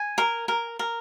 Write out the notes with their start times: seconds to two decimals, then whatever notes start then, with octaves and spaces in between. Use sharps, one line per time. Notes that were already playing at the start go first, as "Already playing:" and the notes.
Already playing: G#5
0.18 A#4
0.48 A#4
0.79 A#4